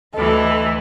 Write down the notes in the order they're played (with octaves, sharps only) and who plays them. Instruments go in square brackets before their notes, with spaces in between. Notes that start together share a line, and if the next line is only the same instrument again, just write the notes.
[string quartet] D2 E3 [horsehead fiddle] A4 [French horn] D#5